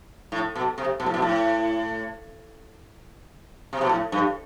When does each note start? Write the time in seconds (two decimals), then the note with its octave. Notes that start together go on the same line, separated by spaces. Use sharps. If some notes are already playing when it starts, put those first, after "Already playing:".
0.32 A2
0.55 B2
0.78 C3
1.00 B2
1.06 A2
1.14 B2
1.22 A2
3.73 C3
3.81 B2
3.89 A2
4.12 G2